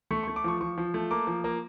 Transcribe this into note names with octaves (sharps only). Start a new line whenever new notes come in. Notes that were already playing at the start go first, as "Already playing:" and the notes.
A3 C#6
A3 C#6
D6
F3 C#6
F3 C#6
F3
A3
A#3 D6
F3
A#3